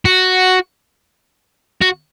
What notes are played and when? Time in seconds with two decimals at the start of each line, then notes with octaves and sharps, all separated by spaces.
0.05 F#4
1.82 F#4